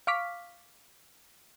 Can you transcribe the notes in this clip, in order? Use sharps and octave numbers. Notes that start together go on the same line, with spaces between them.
F5 C#6 D6 F6 B6